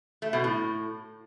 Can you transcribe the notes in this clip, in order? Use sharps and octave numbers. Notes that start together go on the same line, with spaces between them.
A3
B2
A2